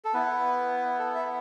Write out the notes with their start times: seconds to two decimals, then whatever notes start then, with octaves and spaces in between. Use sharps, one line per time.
0.05 A4
0.14 B3 E4 B4
0.99 A4
1.15 E5